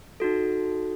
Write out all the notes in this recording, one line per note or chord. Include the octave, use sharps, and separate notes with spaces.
D#4 F#4 A4